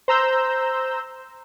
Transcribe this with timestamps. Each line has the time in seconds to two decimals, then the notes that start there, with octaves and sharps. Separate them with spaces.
0.08 C5 A#5 E6 G6